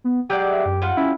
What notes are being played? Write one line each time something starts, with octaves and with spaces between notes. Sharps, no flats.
B3
F#3 G#3 G4 D5 G6
E5
F#2
G3 F4 F#5
C#4 E4